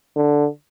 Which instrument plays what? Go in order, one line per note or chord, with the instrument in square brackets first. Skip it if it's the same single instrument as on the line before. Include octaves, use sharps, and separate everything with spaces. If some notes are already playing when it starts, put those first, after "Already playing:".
[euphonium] D3